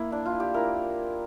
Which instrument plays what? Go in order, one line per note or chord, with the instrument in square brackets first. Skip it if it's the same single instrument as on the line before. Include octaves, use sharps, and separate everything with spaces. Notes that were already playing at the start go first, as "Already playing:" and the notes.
Already playing: [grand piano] A#3 E4
[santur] D4 [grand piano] E4
[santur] F4
[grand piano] E4
[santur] G4
[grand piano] E4 [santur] A#4